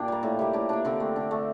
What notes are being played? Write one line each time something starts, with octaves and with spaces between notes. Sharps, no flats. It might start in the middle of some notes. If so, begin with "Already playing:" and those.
Already playing: A#2 D4 F4 G4
G3 A#3
A2
G3 A#3
A2 D4
G3 A#3 D4
D3 C4
A3
D3
A3